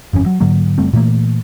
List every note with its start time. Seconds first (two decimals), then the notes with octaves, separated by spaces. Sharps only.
0.13 G1 F2 A#2 C#4
0.26 F#3
0.40 G#2 D3 F#3 A#3
0.78 F#1 G3 A3 C4
0.93 A#2 E3 A3 A#3